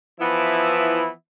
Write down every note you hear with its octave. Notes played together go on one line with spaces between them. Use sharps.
E3 F3 B3 E4